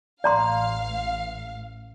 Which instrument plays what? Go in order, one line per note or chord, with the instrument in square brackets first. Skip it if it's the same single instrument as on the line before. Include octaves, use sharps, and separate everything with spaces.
[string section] A1 F5 [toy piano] D5 A#5 C6